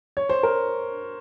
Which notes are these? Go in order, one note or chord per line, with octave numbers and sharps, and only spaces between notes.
C#5
C5
A#4